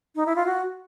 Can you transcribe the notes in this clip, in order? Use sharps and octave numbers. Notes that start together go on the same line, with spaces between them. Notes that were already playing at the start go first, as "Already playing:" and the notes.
D#4
E4
F4
F#4